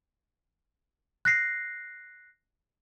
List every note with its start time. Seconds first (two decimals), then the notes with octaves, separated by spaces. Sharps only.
1.25 F#6 A#6 C7